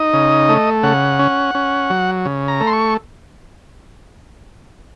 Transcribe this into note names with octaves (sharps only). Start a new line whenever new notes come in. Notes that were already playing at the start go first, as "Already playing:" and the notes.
Already playing: D#4 D#5
C#3
A3
C#3 F#5
C#4
C#4
F#3
C#3
A#5
A3
C6
C#6